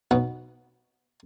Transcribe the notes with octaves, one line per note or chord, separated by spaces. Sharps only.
B1 B2 B3 B4